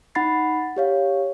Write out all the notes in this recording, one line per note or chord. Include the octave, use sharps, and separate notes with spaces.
D#4 F#5 B5 A6 C7
G4 C#5 F5